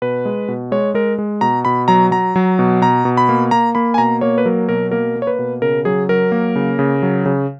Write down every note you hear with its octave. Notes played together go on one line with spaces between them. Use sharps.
B2 B4
G#3
B2
G#3 C#5
G#3 A#4
G#3
B2 A#5
B2 B5
F#3 A#5
F#3 A#5
F#3
B2
B2 A#5
B2
B5
A#3
A#3 A#5
A#3 B5
G#5
B2 A#5
A#3 C#5
B4
F#3 A#4
B2 A#4
A#3 A#4
A#3
C#5
B4
B2
C#3 A#4
F#3 G#4
F#3 A#4
A#3
C#3
C#3
F#3
C#3